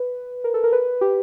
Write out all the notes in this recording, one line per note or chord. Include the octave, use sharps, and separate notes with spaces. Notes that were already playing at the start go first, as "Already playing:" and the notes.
Already playing: B4
A#4
A4
A#4
B4
G4